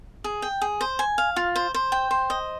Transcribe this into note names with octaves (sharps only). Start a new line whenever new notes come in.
G#4
G5
G#4
C5
G#5
F5
F4
C5
C5
G5
C5
D#5